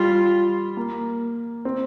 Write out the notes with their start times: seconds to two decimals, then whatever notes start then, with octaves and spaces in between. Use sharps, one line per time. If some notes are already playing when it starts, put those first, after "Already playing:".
Already playing: G3 F4
0.77 A#3
1.65 C4